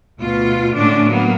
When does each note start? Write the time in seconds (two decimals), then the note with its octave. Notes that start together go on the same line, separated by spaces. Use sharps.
0.19 D2 B2 F4
0.75 A2 D3 G#3 C#4 D4
1.05 F#3 A#3 B3